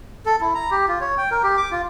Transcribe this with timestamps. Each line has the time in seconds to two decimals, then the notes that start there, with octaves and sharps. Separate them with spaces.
0.26 A4
0.41 E4
0.55 A#5
0.71 G4
0.88 F4
1.01 C#5
1.18 G5
1.31 A#4
1.43 G4
1.57 D6
1.71 F4